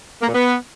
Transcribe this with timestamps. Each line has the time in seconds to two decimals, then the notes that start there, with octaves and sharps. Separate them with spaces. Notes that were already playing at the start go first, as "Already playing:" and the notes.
0.21 A#3
0.27 A#2
0.33 B3